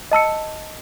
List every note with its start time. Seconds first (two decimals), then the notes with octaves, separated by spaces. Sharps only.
0.11 D#5 A5 E6 C#7